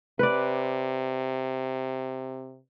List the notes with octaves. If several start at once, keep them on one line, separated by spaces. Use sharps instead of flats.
C3 B4 D5